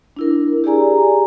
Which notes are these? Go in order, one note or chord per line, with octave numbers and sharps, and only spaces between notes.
D4 E4 A#4
G4 G#4 D5 G#5 A#5